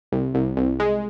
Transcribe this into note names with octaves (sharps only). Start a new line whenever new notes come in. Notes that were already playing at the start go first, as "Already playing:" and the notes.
C2
C2
C2
G#3